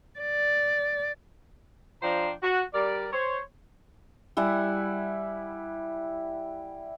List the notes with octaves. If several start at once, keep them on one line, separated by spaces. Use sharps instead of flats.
D5
F3 D4 C5 G5 A#5
F#4
G3 A#4 D5
C5 C#5
G3 E4 F#5 G#5